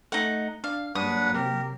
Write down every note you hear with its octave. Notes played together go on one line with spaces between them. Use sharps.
A3 D#4 F#5
D4 F5
G2 F#3 A#3 D4 B4 F#5 D#6
C3 G4 A#4